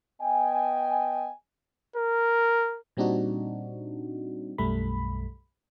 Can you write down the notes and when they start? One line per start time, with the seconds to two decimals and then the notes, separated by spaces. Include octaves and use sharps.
0.22 B3 D#5 G5 G#5
1.96 A#4
2.97 A#2 G3 C4 D4 D#4 F#4
4.58 B1 F#2 G3 A3 B5